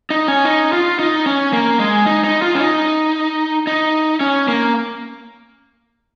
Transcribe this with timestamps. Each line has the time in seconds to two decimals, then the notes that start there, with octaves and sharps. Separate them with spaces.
0.10 D#4
0.28 C#4
0.45 D#4
0.73 F4
0.99 D#4
1.26 C#4
1.53 A#3
1.79 G#3
2.06 D#4
2.24 D#4
2.42 F4
2.55 C#4
2.60 D#4
3.67 D#4
4.21 C#4
4.48 A#3